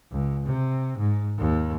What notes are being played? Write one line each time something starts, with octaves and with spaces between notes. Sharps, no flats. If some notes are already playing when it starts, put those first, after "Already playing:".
C#2
C3
G#2
D#2